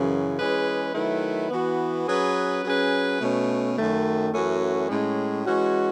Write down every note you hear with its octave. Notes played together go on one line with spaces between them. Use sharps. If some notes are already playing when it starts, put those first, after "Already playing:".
Already playing: F#2 C#3 E3
E3 G#3 C#4 G#4 B4
D#3 F#3 A3 E4 B4
E3 B3 F#4
F#3 C#4 G#4 B4
F#3 C#4 G#4 B4
B2 A3 C#4
F#2 D#3 A3
F#2 E3 A3 C#4 F#4
A2 G#3 C#4
E3 G#3 C#4 F#4